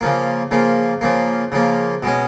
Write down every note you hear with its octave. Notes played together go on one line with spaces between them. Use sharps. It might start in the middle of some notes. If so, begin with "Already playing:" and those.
C#3 F3 A#3
C#3 F3 A#3
C#3 F3 A#3
C#3 F3 A#3
B2 G#3 C#4